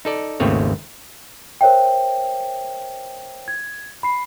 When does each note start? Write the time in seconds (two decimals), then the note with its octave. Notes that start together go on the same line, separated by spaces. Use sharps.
0.05 D#4 A4 D5
0.40 G#1 D#2 C#3 A3 C4 C#5
1.61 A#4 C5 C#5 E5 G5
3.48 G#6
4.03 B5 C7